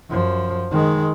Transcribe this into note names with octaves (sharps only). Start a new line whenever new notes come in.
F#2 F3
D#3 G#3